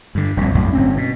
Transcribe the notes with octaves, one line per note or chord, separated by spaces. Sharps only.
G2 D3
F1 C2 A#2
B1 F#2 A2 A3
G1 C4 C#4
B2